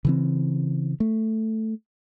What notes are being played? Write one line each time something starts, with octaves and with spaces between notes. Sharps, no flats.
C#3 E3 C4
A3